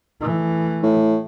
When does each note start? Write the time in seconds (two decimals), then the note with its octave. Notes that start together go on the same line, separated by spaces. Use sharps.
0.21 E3 A3
0.83 A2